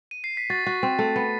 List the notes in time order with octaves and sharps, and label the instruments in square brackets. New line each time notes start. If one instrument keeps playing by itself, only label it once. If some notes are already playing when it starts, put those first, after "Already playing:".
[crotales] D#7
C7
B6
[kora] F#4 [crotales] A6
[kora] F#4
C4
A3
B3